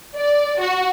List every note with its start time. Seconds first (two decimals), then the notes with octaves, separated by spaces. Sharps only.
0.16 D5
0.60 F#4